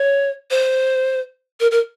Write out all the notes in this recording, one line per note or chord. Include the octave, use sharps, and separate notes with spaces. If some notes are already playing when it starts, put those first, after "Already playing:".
Already playing: C#5
C5
A#4
A#4